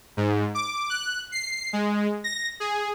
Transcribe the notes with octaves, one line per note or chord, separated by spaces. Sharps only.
G#2
D6
F#6
C7
G#3
A#6
G#4